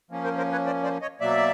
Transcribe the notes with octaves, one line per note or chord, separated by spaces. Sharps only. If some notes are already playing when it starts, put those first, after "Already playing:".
F3 A#3 C#4
A#4 C5
A#4 C5
B4 C#5
C5 D5
C5 D5
C#5 D#5
B2 F#3 A#3 D5 E5